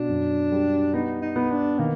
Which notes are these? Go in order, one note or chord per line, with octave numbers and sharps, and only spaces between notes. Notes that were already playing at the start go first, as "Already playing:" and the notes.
Already playing: B2 D4
F#2
G3
B3 D#4
D#4
B3
D4
D#3 A#3